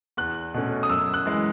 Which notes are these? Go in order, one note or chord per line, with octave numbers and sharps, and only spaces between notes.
E2 F#6
B2 A3 C#4
D#6
F#2 E6
F#6
E3 G#3